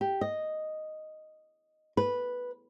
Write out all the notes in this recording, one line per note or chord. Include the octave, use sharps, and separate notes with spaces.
G4
D#5
B4